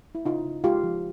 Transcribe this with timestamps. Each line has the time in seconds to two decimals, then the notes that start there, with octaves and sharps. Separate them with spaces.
0.15 E4
0.25 C#3 D#4 F4
0.45 C#3
0.64 G#3 F4 G4
0.84 F3